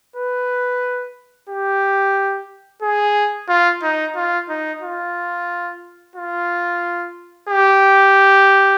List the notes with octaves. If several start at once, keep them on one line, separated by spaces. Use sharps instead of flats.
B4
G4
G#4
F4
D#4
F4
D#4
F4
F4
G4